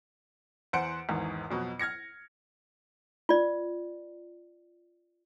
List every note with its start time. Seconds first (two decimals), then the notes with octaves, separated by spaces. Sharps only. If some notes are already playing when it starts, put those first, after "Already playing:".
0.73 E2 C5 F#5 C#7 D7
1.09 G#1 E2 G#2
1.51 F2 B2 F#3
1.79 F6 G#6 A#6 C#7
3.29 F4 D5